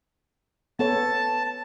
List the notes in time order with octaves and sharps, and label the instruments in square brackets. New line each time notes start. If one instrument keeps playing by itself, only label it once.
[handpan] B3 A4 C#5 [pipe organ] A5